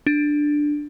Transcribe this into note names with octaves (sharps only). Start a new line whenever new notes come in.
D4